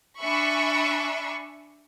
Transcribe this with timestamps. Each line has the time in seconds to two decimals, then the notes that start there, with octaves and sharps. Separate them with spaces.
0.20 D4 E5 G#5 B5 C#6